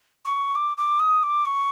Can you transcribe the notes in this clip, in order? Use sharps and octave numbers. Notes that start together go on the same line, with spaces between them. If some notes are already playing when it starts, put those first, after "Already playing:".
C#6
D6
D6
D#6
D6
C#6